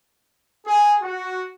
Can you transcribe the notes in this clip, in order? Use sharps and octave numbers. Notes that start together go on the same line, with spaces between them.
G#4
F#4